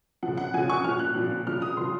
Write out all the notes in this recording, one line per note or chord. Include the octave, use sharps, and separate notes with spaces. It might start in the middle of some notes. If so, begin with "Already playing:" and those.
C#3 F3 F#5
F#5
C#3 F3 G#5
C#6
A#2 F3 F6
F#6
A#2 F3
C#3 F3 F6
D#6
C#3 F3 C6